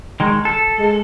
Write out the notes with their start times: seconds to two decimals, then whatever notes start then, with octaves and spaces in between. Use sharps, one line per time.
0.20 D#3 G#3
0.45 A4
0.79 G#3